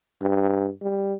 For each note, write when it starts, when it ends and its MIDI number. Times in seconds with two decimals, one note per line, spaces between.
0.22 0.70 43
0.82 1.14 55